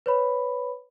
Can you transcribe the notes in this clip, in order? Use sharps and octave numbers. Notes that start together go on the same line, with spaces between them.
B4 C#5 B5